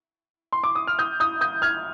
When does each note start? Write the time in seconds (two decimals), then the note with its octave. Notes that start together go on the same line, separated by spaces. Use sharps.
0.53 C6
0.64 D6
0.75 D#6
0.87 F6
0.99 D#6 G6
1.20 D#6 G6
1.41 D#6 G6
1.62 F6 G#6